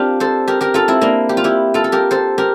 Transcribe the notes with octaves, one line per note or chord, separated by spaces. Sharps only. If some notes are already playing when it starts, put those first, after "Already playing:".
Already playing: C4 D4 F4 G4 A#4
A4 C5
G4 A#4
G4 A#4
F4 A4
C4 E4
A#3 D4
G4
F4
E4 G4
F4 A4
A4
G4 A#4
A4 C5
G4 A#4